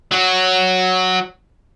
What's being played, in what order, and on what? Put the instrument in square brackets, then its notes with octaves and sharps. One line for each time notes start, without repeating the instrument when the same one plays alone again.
[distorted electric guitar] F#3 F#4